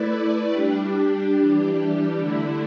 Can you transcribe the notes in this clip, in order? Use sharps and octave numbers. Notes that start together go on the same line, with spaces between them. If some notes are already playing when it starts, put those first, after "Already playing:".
Already playing: A3 E4 B4 D5
G3 D4 G4
E3 G3 D4 G4
D3 A3 E4